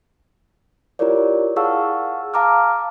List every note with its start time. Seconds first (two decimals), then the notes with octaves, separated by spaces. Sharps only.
0.99 E4 F4 G4 A#4 C#5 D5
1.56 G#4 F5 F#5 A5 C#6 E6
2.34 F5 A5 A#5 D6 F6